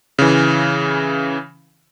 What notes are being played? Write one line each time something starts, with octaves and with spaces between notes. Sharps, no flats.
C#3 E3